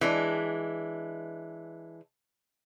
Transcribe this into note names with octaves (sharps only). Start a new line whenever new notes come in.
E3 G#3 D4